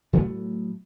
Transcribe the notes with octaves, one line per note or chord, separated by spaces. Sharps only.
A2 F#3 A3 B3